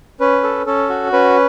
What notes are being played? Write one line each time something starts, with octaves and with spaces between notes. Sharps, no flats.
C#4 B4
A4
C#4 A4
F#4
C#4 B4